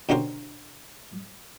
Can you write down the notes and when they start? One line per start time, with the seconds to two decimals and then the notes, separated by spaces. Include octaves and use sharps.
0.09 B2 D3 C#4 G4 A#4 C5